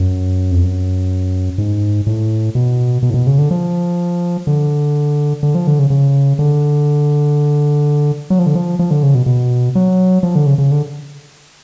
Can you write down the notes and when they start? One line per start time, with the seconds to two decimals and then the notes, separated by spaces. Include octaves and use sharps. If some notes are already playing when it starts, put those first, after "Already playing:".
Already playing: F#2
0.52 F2
0.63 F#2
1.58 G#2
2.07 A2
2.55 B2
3.03 B2
3.10 A2
3.14 B2
3.27 C#3
3.38 D3
3.51 F3
4.47 D3
5.43 D3
5.55 F3
5.67 D3
5.79 C#3
5.90 C#3
6.39 D3
8.30 F#3
8.39 F3
8.46 D3
8.55 F3
8.79 F3
8.91 D3
9.03 C#3
9.15 B2
9.26 B2
9.75 F#3
10.23 F3
10.35 D3
10.46 C#3
10.58 C#3
10.71 D3